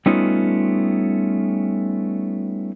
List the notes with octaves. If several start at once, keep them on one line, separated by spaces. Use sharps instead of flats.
G3 A3 B3 C#4 D#4 F4